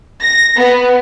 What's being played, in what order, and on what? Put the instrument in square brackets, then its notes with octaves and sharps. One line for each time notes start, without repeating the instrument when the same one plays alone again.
[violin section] A#6
B3